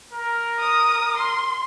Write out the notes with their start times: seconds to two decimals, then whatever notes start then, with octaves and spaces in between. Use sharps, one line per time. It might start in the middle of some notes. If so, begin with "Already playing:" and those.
0.13 A#4
0.60 D#6
1.17 C6